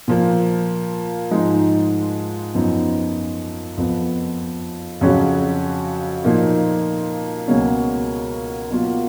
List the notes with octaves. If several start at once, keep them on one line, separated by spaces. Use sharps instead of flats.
A#2 F3 A#3
G#2 F3 G#3 D#4
F#2 F3 B3 D#4
F2 F3 B3
F2 C#3 F#3 C#4 F#4
A#2 F3 A#3 D#4
C#2 B2 F#3 A#3 C#4
B2 F#3 A#3 F4